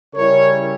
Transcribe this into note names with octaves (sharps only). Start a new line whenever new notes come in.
C#3 G3 C#4 E4 A#4 C#5